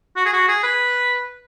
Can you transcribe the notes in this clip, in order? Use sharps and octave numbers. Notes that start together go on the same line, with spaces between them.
F#4
G#4
F#4
G#4
B4